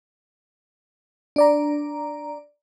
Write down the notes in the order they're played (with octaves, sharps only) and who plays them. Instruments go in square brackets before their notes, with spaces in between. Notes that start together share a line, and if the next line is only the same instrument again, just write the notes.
[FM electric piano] D4 D5 A#5